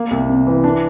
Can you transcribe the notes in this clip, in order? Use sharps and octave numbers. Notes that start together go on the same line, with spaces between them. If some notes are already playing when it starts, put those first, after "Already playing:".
Already playing: A#3
C2
C3
E3
D4